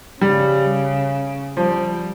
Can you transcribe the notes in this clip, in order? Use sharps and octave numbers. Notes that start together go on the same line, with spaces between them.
C#3 G3
F3 G3